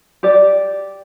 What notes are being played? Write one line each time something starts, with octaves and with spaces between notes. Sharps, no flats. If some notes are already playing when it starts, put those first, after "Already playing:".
G4 D5